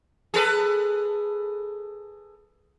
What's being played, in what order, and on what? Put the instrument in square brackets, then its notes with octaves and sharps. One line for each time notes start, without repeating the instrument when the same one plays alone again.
[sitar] G#4 A4 B4